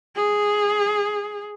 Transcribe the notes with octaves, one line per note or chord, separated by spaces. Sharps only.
G#4